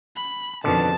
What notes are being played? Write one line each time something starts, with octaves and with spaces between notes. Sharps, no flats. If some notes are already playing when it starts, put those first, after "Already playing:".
B5
F2 B2 D3 D#3 A5